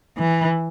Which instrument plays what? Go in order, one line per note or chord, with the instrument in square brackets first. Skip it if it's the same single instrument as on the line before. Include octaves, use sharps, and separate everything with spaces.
[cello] E3